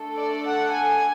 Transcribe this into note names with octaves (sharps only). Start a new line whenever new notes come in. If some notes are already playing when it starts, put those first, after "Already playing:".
Already playing: A3 D4 A4
D5
F#5
G#5